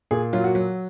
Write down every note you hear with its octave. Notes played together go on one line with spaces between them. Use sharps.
A#2 G#4
F#3 F4
F#4
F#3